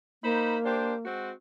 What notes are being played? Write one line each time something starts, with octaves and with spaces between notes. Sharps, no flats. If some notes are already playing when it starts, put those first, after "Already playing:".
A#3 D#4 C5 B5
D4 G4 C5
G#3 C4 F#4